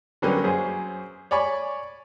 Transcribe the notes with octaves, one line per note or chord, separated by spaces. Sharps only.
D3 F#3 G3 A#3 B3 C#4
F#2 G#4 C5
C#5 D5 G#5 B5 C#6